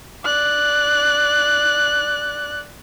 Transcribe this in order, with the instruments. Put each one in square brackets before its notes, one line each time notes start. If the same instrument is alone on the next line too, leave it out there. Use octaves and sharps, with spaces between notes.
[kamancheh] D5 F#6